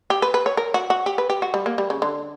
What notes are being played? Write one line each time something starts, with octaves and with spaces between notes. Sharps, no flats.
G4
B4
B4
C#5
A#4
F#4
F#4
G4
B4
G4
F#4
G3
A#3
G3
C#3
D3